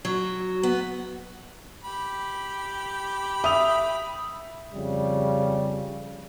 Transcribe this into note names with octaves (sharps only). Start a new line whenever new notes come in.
F#3
B3
G4 B5
E5 D#6 F7
F2 C#3 G3